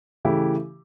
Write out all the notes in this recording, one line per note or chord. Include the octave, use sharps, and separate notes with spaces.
C#3 E3 A3 E4 G4